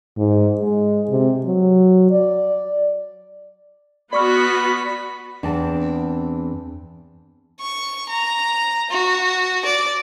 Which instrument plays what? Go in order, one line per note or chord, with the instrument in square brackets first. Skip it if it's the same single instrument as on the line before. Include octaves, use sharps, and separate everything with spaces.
[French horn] G#2
G#3
C3
F#3
D5
[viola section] B3 F#4 [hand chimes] D5 C#6 F6 [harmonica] B5
[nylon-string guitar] E2 C4 D4 A5
[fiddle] C#6
A#5
F#4
D5